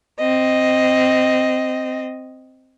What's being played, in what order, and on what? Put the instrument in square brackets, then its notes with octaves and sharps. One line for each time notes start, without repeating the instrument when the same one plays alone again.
[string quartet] C4 D#5